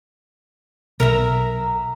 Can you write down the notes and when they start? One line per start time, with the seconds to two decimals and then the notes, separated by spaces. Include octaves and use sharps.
1.00 B1 A#4 E5 A#5